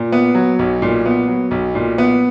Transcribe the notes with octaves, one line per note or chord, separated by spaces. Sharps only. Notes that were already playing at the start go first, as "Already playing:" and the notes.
Already playing: A#2
B3
F#3
B1
A#2
B3
F#3
B1
A#2
B3